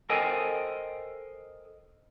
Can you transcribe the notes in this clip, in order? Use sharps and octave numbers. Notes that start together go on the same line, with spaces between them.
A4 A#4 C5 D#5 G5 G#5